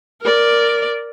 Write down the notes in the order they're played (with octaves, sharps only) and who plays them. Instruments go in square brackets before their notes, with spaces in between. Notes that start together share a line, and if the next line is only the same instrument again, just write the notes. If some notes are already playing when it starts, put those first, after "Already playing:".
[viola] A#4 D5